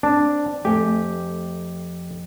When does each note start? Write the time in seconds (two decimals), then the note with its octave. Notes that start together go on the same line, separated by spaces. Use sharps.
0.03 C4 D4
0.65 F2 A3 G4 G#5